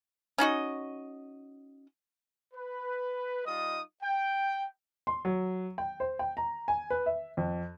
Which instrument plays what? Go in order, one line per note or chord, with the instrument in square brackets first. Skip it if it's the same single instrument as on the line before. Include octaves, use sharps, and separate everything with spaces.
[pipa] C#4 D#4 F#4 D#5
[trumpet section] B4
G3 D#4 F4 D#5 D#6
G5
[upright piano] C6
F#3
G5
C5
G5
A#5
G#5
B4
E5
F2